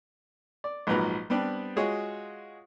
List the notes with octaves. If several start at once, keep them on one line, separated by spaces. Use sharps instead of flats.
D5
A#1 G#2 F3 F#3 B4 A#5
G3 B3 C4 D4 B4
G#3 F4 F#4 G#4 C#5